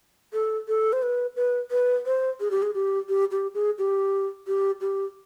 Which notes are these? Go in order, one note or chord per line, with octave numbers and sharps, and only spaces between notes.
A4
A4
C5
B4
B4
B4
C5
G#4
G4
G#4
G4
G4
G4
G#4
G4
G4
G4